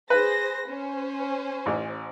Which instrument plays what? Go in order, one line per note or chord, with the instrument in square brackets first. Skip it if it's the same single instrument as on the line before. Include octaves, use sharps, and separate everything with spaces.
[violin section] G#4 C5 A#6 [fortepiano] B4
[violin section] C#4 C5
[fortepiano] A1